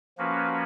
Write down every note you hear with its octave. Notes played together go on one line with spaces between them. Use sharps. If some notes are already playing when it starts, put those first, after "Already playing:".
F3 A#3 C#4 F#4 B4